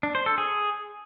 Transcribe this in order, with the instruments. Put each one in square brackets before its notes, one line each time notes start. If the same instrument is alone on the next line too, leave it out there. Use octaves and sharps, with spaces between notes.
[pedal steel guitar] D4
C5
A4
G#4